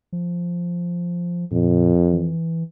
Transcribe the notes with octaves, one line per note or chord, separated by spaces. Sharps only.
F3
F2 A#2
E3